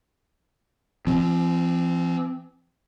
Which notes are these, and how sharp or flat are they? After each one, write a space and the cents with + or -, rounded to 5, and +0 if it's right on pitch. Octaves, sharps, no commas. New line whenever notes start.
F3 -40 C4 +0